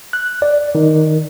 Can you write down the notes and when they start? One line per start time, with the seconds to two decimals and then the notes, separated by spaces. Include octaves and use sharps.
0.13 F#6
0.42 D5
0.75 D#3